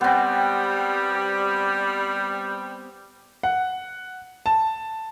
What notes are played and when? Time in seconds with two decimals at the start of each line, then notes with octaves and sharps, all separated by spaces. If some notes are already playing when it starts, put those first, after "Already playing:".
0.01 G3 B3 C4
3.43 F#5
4.46 A5